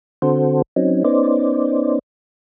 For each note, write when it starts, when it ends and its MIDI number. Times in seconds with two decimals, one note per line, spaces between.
0.22 0.62 50
0.22 0.62 60
0.22 0.62 66
0.22 0.62 69
0.22 0.62 72
0.76 1.03 54
0.76 1.03 60
0.76 1.03 61
0.76 1.03 63
1.05 1.99 59
1.05 1.99 61
1.05 1.99 63
1.05 1.99 72
1.05 1.99 74